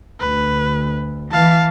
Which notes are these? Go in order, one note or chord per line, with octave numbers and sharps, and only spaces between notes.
D2 B4
E3 F5 A5